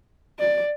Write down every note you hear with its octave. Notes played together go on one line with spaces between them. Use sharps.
D5